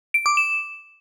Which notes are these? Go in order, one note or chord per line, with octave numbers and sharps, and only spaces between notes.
D7
D6
E7